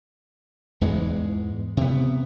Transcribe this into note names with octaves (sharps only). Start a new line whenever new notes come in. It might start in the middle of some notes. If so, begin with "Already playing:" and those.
E2 G#2 E3 G#3
C3 B3